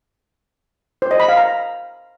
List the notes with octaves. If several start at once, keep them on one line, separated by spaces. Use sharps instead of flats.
C5
D#5
B5
F5
A#5